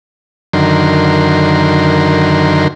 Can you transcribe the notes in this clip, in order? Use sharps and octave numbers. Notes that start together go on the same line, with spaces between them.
F#2 D3 D#3 A#4 C6